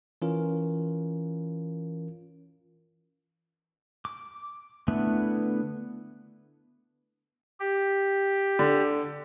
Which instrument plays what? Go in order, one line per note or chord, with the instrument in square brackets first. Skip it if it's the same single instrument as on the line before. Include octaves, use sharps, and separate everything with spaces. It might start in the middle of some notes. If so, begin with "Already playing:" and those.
[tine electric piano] E3 C#4 F4 A#4
[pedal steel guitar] D6
D3 A3 B3 E4
[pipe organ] G4
[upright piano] D3